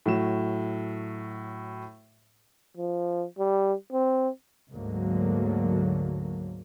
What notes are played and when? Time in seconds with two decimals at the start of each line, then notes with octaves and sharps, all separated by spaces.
0.06 A2 F#3 E7
2.77 F3
3.39 G3
3.92 C4
4.73 D2 G#2 D3 F#3 A#3